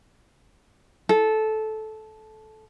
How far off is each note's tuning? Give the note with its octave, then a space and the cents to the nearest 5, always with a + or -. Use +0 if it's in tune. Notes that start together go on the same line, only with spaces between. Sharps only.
A4 -15